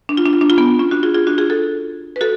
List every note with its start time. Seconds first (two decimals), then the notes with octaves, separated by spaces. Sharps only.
0.09 D4
0.17 F4
0.26 D4
0.33 F4
0.41 D4
0.50 F4
0.57 B3 D4
0.79 C#4 F4
0.91 D4 F#4
1.03 F4 G#4
1.14 F4 G#4
1.27 D4 F#4
1.38 F4 G#4
1.50 F#4 A4
2.16 B4
2.21 F#4 A4